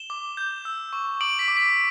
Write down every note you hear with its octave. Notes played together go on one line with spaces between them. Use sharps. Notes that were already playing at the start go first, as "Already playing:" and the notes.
Already playing: E7 G7
D6
G6
E6
C#6
D6 D7 F#7
B6 D7
D6
B6 D7